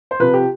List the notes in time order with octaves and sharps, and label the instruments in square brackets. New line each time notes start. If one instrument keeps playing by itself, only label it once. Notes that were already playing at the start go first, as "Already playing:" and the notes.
[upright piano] C5
C3 F3 B4
G4